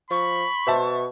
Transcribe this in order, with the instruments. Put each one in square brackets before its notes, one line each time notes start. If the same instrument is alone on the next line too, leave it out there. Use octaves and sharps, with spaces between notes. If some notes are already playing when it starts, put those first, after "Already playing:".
[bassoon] F3 [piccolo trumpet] B5 [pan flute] C#6
[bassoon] B2 [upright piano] C5 E5 A5